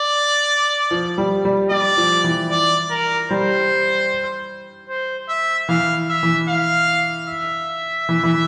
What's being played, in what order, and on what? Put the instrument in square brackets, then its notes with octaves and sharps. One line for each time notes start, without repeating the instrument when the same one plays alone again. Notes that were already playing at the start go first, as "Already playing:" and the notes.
Already playing: [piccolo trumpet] D5
[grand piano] F3
G3
G3
[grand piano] G3 [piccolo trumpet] D5
[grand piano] F3
E3
[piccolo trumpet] D5
A#4
[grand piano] G3 [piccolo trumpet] C5
[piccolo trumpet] C5
E5
[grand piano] E3 [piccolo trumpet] F5
[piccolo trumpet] E5
[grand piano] E3
[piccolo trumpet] F5
E5
[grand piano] E3
E3